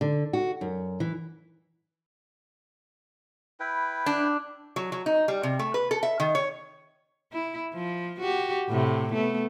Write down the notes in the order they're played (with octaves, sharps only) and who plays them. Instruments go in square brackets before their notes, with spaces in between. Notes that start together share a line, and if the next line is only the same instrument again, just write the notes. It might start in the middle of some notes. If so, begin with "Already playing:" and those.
[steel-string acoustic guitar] D3
F#4
F#2
E3
[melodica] E4 B4 G5
[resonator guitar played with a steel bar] D4
F#3
F#3
D#4
G3
C3
A3
B4
A4
E5
D#3
C#5
[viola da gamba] E4
F3
F#4 G4
A2 C3
A3 B3